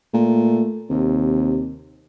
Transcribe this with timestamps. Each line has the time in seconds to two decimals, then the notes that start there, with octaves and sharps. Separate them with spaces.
0.13 A#2 A3
0.90 D#2 C3